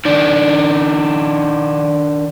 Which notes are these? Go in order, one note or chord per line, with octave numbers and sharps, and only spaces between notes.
D#3 D4